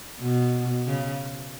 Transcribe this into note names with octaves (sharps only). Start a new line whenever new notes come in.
B2
C#3